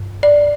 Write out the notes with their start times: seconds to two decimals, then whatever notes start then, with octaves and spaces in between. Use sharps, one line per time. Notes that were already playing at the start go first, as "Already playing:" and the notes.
Already playing: G2
0.23 D5